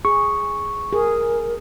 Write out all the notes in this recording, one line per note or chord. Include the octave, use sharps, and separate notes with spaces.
G#4 C#6
G#4 A#4